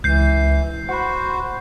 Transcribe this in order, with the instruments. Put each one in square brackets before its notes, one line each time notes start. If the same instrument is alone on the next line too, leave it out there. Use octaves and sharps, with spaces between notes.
[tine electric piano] C#2 [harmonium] E3 [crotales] G6 C7
[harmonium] F#4 C5 [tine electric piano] F#5 B5